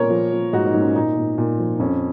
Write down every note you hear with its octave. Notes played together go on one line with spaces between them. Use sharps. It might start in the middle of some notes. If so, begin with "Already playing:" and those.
Already playing: A#2 A#4 C#5
F3
F3
G#2 D#4 F#4
D#4
G#2
C#4
A#2 D#4
A#2
A#2
F3
F2 C#4